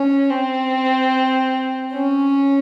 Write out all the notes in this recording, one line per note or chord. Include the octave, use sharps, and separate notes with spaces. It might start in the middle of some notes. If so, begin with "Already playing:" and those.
Already playing: C#4
C4
C#4